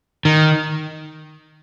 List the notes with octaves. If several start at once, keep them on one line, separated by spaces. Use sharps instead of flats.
D#3